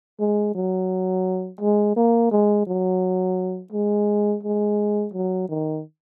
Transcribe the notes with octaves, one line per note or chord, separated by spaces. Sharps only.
G#3
F#3
G#3
A#3
G#3
F#3
G#3
G#3
F#3
D#3